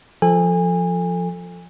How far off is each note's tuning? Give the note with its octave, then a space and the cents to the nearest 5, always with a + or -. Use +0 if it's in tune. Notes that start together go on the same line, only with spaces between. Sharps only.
F3 +0 A4 +0 G#5 -30